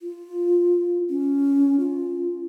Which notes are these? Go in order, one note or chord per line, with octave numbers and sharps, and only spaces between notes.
F4
C#4
F4